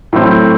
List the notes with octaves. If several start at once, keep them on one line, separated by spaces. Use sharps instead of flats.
A2 F#3 A3 C4